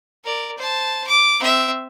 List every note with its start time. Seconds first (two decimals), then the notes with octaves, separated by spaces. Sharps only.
0.24 A#4 D5
0.57 C5 A5
1.07 D6
1.39 C4 E5